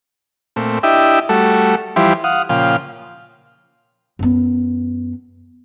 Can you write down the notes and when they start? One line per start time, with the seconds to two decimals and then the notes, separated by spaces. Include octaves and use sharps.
0.56 A#2 A3 C4
0.83 D4 E4 G4 D#5 E5 G5
1.29 G3 A3 F#4 A4
1.96 E3 F3 G3 E4 G4 C5
2.24 F5 F#5 D#6
2.49 A#2 C#3 F3 F5 G5
4.19 F#2 B3